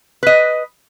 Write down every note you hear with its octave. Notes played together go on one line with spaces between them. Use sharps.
B4 D#5